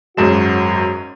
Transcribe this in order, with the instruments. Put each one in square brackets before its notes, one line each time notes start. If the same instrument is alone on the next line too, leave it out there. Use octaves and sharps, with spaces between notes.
[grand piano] G#1 F#2 E7 [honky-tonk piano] G#3 C#4 [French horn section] F#4